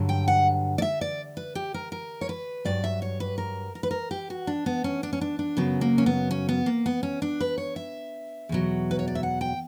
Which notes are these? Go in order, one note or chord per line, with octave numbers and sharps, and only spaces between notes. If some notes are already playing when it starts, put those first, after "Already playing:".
Already playing: G2 D3 F#3
G5
F#5
D5
E5
D5
B4
G4
A#4
A#4
C#5
B4
G2 F#3 D5
E5
C#5
B4
A#4
A#4
B4
A#4
G4
F#4
D4
B3
C#4
D4
C#4
D4
D4
F#2 C#3 F#3 B3
A#3
C#4
B3
C#4
B3
A#3
B3
C#4
D4
B4
C#5
E5
E2 B2 F#3
B4
C#5
D5
E5
F#5
G5